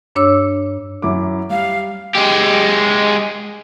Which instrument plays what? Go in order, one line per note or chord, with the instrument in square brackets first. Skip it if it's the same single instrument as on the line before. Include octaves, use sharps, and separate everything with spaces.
[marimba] G2 D4 C#5 D6 E6
[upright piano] F#2 E4 D6
[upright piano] G3 [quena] F5
[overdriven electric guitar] G#3 G4